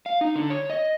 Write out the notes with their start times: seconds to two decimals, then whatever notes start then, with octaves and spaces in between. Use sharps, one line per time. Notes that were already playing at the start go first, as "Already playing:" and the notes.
0.06 F5
0.21 D#4
0.36 D3
0.50 C#5
0.70 D#5